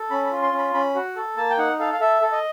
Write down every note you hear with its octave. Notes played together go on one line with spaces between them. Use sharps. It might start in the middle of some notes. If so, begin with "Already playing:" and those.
Already playing: A4
C#4 B5
B5
F4
C6
C#4
B5
C#4 B5
F#4
A4
A#3 A5
G5
D#4 F#5
A4 F5
F5
A4 E5
A4
D#5